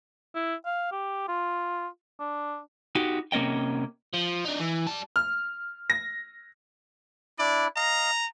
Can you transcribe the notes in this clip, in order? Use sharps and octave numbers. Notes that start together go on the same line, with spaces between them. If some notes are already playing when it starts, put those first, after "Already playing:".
E4
F5
G4
F4
D4
D#4 F#4 G4
C3 A#3 C#4 D#5 G5
F3
D4 D#4
E3
G3 A5
F6
A#6
D4 E4 D5
D#5 F5 A#5